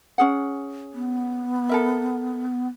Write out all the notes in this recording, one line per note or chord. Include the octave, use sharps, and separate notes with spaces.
C#4 G#4 F#5
B3
A4 A#4 E5